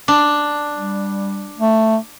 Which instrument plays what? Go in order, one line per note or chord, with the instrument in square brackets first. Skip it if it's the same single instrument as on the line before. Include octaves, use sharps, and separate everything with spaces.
[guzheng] D4
[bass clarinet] G3
A3